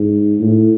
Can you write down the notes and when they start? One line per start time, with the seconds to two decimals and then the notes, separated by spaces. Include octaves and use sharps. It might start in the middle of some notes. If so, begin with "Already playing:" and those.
Already playing: G#2
0.41 A2